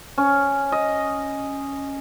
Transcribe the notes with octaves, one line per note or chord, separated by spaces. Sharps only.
C#4
D#5